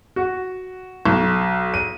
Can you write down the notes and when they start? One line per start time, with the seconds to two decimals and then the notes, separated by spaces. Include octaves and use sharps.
0.16 F#4
1.05 B1
1.74 D#7